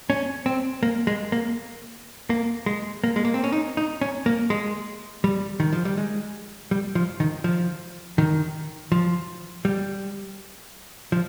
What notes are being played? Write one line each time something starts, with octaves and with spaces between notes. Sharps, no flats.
C#4
C4
A#3
G#3
A#3
A#3
G#3
A#3
G#3
A#3
C4
C#4
D#4
D#4
C#4
A#3
G#3
G3
D#3
F3
G3
G#3
G3
F3
D#3
F3
D#3
F3
G3
F3